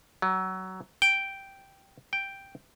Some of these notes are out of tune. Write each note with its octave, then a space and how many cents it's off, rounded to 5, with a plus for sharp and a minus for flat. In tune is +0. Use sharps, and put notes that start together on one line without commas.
F#3 +20
G5 -5
G5 +0